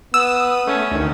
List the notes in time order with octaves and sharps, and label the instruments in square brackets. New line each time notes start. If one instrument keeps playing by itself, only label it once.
[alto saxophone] B3 [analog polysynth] D#6 [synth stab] E6
[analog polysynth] A3 [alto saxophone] C#4
[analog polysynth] D2 D#3